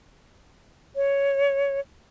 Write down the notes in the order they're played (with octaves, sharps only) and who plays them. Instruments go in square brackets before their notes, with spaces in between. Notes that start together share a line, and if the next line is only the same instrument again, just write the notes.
[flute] C#5